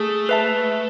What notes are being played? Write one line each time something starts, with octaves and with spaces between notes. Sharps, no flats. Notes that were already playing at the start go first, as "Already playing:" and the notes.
Already playing: A3 G#4
B4 E5 A5